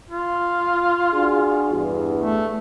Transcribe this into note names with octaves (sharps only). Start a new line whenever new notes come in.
F4
D4 F#4 G#4
E2 G2
A3